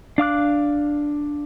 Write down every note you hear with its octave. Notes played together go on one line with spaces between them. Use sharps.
D4 F5 D6 F#6